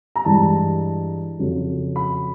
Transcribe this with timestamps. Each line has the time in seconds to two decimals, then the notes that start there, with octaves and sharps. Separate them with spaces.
0.16 A#5
0.25 G2 E3 G#3 A5
1.39 F2 C#3 F#3
1.96 B5